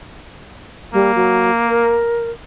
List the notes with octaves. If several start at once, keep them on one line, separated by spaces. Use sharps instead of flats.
G3 A#3
F#3
A#4